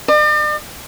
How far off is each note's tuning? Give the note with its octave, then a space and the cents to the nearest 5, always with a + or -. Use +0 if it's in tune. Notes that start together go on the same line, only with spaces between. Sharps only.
D5 +45